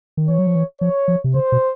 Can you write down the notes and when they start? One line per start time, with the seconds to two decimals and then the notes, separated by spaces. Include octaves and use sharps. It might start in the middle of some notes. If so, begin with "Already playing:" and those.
0.17 D#3
0.28 E3 C#5
0.39 F#3
0.47 F3
0.55 E3
0.81 F3 C#5
1.08 F3
1.24 C3
1.34 C#3 C5
1.52 B2